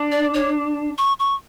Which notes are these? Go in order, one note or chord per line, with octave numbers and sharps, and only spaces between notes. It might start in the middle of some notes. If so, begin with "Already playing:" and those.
Already playing: D4
D5
C#5
C#6
C#6